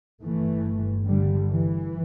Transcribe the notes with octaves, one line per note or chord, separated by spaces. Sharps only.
G1 G2 E3 A3
D3 G3
E3